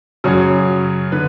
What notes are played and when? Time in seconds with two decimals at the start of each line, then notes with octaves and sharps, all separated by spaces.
0.24 F#2 C#3 F#3 C#5
1.12 D3 B4